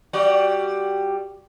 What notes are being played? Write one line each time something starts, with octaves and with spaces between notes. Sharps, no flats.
G3 F#4 D5